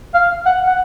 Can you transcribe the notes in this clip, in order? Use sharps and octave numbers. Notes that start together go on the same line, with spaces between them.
F5
F#5
F#5